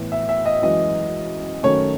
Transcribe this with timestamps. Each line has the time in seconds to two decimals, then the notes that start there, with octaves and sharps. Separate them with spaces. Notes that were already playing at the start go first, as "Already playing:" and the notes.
Already playing: A2 E3 B3
0.12 E5
0.29 E5
0.46 D#5
0.62 F#2 E3 G#3 D#5
1.63 F#2 D#3 A3 C#4 C#5